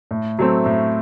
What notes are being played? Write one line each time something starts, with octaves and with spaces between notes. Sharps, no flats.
A2
F#3 A3 C4
A2